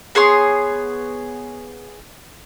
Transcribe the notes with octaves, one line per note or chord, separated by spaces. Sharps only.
B3 G#4 C#5 C6